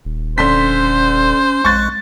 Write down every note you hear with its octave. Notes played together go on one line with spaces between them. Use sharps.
D#1
D3 C#4 C5 C6 B6
A#1 G#3 C#6 F#6 A6